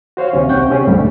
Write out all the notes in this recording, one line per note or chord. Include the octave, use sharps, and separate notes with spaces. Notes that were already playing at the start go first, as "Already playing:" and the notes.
F#4 C5 C#5 F5
D#2 C3 C#4
C2 C3 F#5 G5 C#6 G6
C4 C#4 G4 G#4
C#2 G2 A#2 F3 G3 A3